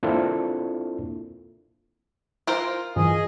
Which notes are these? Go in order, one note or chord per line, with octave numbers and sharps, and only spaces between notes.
A#3 C4 D4 E4 F4 A4
F4 A#4 C5 D7
G2 E3 F3 G#4 D#5